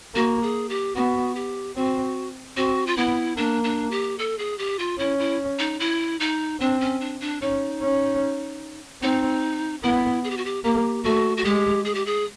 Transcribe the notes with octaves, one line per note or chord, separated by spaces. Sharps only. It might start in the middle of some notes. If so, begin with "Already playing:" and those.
A#3 F#4
G#4
G4
B3 F#4
G4
C4 F#4
C4 F#4
F4
B3 E4
A#3 D4
D4
G4
A4
G#4
G4
F4
C#4 E4
E4
D#4
E4
D#4
C4 D4
C#4
D4
D4
C#4 D#4
C#4
C4 D#4
B3 E4
G#4
G4
F#4
G4
A#3 G4
A3 F#4
F#4
G#3 G4
G#4
G4
G#4